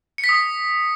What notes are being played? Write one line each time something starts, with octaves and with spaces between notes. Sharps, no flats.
C#7
B6
D#6
B6